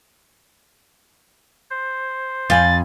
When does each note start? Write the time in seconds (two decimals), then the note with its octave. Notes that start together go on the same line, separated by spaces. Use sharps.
1.70 C5
2.50 F2 F4 G#5 B5 A6